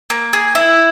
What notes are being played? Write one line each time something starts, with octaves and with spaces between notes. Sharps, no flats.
A#3
G#4
E4